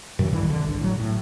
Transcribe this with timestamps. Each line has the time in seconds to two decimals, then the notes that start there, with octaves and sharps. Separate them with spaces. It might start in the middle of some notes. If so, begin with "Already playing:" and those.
0.19 F#2 C3 E3 F#3
0.33 C#2 G2 D#3 E3
0.50 C2 D3
0.64 G#1
0.81 A2 F#3
1.00 A2